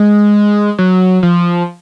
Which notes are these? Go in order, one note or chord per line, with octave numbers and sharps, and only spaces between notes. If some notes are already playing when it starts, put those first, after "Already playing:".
Already playing: G#3
F#3
F3